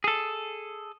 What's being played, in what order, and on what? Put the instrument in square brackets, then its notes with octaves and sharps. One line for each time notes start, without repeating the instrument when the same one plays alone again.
[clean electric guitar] G#4 A4